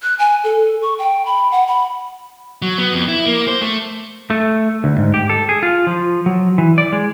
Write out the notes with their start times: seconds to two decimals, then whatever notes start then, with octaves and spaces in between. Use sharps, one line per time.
0.03 F#6
0.19 G#5
0.44 A4
0.82 C#6
0.99 G5
1.26 B5
1.52 F#5
1.67 B5
2.62 F#3
2.78 B3
2.93 F2
3.08 E4
3.26 A#3
3.48 C5
3.61 A3
4.30 A3
4.84 D2
4.98 G#2
5.14 G4
5.29 A4
5.49 G#4
5.63 F4
5.87 F3
6.26 F#3
6.58 E3
6.78 D5
6.93 G#3